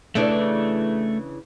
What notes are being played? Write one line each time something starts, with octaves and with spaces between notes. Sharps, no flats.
C#3 E3 A3 D4